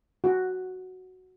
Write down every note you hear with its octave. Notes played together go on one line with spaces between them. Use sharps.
F#4